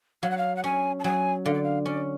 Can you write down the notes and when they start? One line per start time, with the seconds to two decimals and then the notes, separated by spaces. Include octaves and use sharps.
0.23 F#3 F5
0.31 F#5
0.38 F5
0.57 F#5
0.64 C#4 G#5
1.00 A5
1.04 F#3 G#5
1.45 D3 F5
1.54 D5
1.64 F5
1.85 C#4 D5